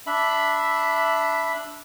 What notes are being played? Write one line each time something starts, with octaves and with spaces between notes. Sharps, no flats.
D4 E5 B5